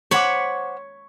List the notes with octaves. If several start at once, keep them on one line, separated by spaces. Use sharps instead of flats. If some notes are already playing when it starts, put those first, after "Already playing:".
C5 C#5 F#5 B5 D6